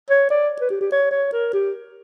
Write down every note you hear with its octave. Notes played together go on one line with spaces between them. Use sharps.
C#5
D5
B4
G4
G4
C#5
C#5
A#4
G4